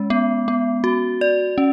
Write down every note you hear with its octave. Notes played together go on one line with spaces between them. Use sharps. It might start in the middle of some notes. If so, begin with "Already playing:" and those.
Already playing: G#3 C#4
B3
B3
F#4
D5
C#4